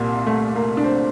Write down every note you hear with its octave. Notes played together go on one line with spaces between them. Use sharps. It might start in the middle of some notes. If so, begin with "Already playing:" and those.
Already playing: C2 A#2 A#3
A3
A#3
D4
C4